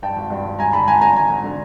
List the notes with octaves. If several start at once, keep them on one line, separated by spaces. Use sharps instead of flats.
G2 G5 A5
G#1
G2
G#1
G2 G#5 A#5
D3 A5 B5
G#1 G#5 A#5
D3 G#5 A#5
G#1 G#5 A#5
G#1
D3